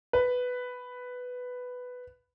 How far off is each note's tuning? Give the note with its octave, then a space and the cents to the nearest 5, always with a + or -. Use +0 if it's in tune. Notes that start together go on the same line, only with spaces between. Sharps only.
B4 +5